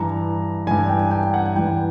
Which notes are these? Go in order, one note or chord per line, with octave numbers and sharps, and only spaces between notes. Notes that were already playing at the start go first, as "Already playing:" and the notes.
Already playing: G2 E3 A#5
G2 E3 G#5
G5
G5
F#5
G2 E3 G5